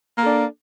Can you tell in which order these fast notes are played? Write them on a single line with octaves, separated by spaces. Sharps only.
A#3 A4 D4